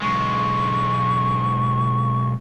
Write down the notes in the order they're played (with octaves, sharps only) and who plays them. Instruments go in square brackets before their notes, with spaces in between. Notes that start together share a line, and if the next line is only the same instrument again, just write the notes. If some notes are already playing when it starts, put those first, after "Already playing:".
[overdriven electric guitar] B1 G#3 [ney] C#6